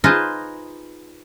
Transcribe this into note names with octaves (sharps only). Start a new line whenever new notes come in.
D#4 F4 G#4 B4 C5 D#5